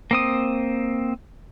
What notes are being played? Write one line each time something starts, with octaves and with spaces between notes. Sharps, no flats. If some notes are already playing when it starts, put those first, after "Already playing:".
A#3 C4 D#6